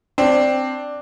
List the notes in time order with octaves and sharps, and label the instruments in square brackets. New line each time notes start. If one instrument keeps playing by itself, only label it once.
[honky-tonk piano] C4 [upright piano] D4